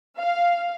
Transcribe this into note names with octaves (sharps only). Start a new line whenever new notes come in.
F5